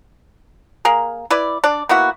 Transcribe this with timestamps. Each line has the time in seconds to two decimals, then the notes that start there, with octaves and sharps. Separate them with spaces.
0.85 A#3 G#4 A#4
1.30 E4 B4 D5
1.64 D4 D5
1.89 A#3 B3 E4 F#4